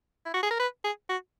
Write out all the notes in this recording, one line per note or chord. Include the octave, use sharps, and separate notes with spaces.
E4
F#4
G#4
A#4
B4
G#4
F#4